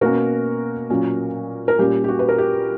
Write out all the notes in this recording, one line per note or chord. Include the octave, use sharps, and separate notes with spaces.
B2 A#3 C#4 F#4 A#4
A#2 F#3 C#4
A#4
A#2 G3 C#4 G4
G4
F#4
B4
A#4
G4